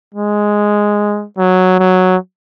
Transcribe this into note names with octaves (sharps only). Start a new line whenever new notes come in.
G#3
F#3
F#3